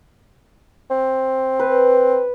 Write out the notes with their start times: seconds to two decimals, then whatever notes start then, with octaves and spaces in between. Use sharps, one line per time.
0.90 C4
1.59 B4